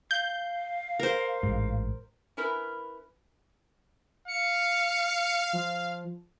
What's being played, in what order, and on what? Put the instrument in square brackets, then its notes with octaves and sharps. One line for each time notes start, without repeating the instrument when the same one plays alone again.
[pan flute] F5 [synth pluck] G6
[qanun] A#4 C5
[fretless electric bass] A1 G#2
[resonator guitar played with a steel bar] C#4 E4 A#4 B4
[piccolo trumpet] F5 [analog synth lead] C#7
[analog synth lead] F3